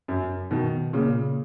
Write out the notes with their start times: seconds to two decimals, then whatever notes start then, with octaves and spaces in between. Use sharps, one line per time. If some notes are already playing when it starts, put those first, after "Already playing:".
0.08 F#2
0.51 B2 D#3
0.93 A#2 C#3